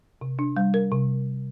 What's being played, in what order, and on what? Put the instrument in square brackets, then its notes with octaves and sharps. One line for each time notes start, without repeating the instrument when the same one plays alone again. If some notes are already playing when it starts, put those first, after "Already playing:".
[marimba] C3
D4
G3
A#4
C3